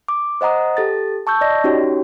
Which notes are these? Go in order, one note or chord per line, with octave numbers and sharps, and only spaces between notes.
D6
C5 D#5 F#5 A#5 D#6
G4 A4 A6
A5 C#6 E6 G6
D5 D#5 A#6
C#4 D#4 F#4 G4 C#5